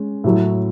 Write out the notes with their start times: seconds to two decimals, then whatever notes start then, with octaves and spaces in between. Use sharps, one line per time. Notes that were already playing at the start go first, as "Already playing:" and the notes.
Already playing: G#3 C#4
0.24 A2 F#3 A3